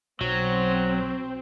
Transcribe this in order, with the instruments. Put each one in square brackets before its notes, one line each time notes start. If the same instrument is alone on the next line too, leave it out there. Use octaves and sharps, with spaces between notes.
[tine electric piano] B1 [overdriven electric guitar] F#3 [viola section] C4